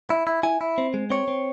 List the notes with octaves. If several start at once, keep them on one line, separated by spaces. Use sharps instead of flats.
E4
E4
E4 G#5
E4
C4
G#3
C4 C#5
C4